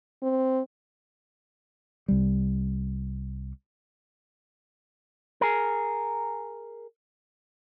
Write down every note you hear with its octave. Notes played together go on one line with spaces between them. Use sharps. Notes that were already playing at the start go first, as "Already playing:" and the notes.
C4
C2 G3
G#4 A#4